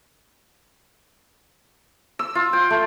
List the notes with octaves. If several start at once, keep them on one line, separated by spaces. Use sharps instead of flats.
E6
F4
G5
A3